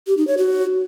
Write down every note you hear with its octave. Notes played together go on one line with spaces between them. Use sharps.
G4
D#4
C#5
F#4